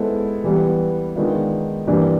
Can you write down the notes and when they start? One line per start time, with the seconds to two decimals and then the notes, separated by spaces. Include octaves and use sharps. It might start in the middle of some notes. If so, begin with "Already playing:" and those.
Already playing: G#3 B3 E4 A4 C5
0.44 E3 G3 B3
1.16 D#3 G#3 B3 D4 F4
1.87 G2 E3 G3 A#3 D4